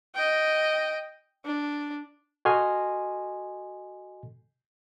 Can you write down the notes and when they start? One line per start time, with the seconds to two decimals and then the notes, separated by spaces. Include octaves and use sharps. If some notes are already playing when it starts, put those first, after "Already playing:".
0.15 D#5 G5
1.46 D4
2.45 F#4 A4 D#5 G#5 C6 F6